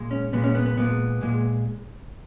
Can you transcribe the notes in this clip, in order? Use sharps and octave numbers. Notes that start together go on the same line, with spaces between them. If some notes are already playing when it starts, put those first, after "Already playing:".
Already playing: A#2 G#3
C#4
A#2 G#3 B3
C#4
B3
B3
A#2 G#3 B3
A#2 G#3